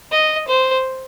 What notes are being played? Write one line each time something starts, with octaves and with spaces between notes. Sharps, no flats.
D#5
C5